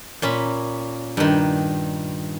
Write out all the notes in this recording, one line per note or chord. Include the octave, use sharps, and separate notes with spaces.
A#2 C#4 B5
G2 D#3